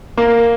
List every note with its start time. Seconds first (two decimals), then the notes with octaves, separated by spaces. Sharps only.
0.17 A#3